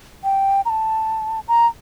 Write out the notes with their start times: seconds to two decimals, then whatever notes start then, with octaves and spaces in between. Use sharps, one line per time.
0.24 G5
0.65 A#5
0.70 A5
1.48 A#5